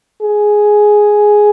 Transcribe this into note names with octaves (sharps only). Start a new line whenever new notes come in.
G#4